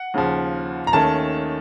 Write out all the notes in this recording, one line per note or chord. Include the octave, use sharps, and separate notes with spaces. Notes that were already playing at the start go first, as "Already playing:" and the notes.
Already playing: F#5
D#2 C#3 F3
A#5
D#2 D#3 A3 C#4 A5